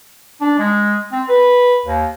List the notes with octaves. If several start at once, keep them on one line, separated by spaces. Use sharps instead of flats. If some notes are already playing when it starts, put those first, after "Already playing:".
D4
G#3
C4
B4
D#2